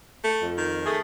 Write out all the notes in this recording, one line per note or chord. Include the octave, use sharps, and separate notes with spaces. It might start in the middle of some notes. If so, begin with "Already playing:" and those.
A3
F2
D#3
A3 G#4